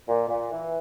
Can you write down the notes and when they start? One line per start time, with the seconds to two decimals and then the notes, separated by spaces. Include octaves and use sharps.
0.08 A#2
0.28 A#2
0.50 E3